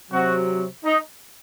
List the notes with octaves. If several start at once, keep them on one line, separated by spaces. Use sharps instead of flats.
C3 F#3 F#4
D#4